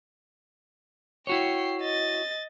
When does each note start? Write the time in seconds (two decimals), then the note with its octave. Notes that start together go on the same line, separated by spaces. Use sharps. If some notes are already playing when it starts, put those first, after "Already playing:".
1.27 E4 F#4 C#5 G5 C7
1.81 D#5 A6